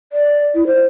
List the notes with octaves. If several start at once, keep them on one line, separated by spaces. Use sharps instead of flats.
D5
E4
C5